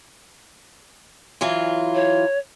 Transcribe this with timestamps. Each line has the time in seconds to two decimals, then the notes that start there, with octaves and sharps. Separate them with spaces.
1.41 E3 F#3 F4
1.95 C#5